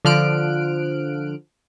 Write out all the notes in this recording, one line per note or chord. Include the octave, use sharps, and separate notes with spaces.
D3 F3 F6 F#6 D7